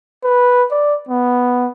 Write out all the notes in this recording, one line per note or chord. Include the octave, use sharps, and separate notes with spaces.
B4
D5
B3